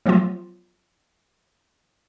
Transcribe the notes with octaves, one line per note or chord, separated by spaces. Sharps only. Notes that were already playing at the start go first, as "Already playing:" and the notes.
F3 F#3 A3 B3 F4